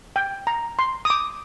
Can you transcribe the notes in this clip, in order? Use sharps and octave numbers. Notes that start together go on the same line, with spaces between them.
G5
A#5
C6
D#6
D6